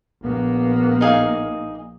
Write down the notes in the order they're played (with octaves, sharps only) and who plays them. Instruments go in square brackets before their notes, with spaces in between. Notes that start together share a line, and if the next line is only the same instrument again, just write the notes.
[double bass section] A#1 A#3 [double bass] B3
[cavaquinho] D#4 G#4 F5